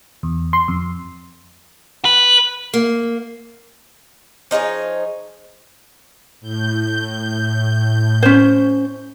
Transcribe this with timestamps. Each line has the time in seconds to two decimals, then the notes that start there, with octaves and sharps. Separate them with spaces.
0.23 E2
0.53 C6
0.68 F2
2.05 B4
2.74 A#3
4.51 F3 D#4 G#4 C#5
6.40 A2 G6
8.23 C#4 C5